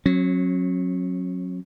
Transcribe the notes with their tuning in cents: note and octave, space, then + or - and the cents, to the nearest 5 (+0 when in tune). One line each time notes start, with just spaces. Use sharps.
F#3 -15 C#4 -40